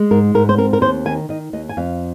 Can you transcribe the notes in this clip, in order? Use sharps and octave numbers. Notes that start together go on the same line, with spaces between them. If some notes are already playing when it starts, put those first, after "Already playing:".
Already playing: G#3
G#2 A#4
G#2 A#4
C5
C4 A#4
A#4
D#2 C5
D#3 G#5
D#3 D#5
D#2 D#5
G#5
F2 F5